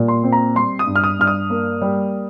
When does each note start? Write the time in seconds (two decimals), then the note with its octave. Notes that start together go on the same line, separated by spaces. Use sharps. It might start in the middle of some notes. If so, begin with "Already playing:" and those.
Already playing: A#2 G3
0.08 C6
0.24 C4
0.32 A#5
0.55 G3 C6
0.79 D#6
0.87 G2
0.96 F6
1.04 D#6
1.19 G2 F6
1.27 D#6
1.50 A#3
1.82 G3